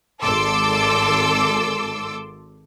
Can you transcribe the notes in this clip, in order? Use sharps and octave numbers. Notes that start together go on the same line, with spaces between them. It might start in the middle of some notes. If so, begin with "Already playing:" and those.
G#1 A4 C6 D6 E6